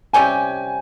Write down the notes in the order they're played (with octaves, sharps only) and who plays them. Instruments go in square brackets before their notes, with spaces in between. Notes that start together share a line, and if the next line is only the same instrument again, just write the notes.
[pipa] C3 G3 C#4 G4 [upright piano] G#5